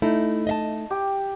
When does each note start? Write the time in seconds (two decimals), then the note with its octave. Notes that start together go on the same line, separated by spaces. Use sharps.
0.02 A3 D#4 E4
0.47 D#5 E5 A5
0.91 G4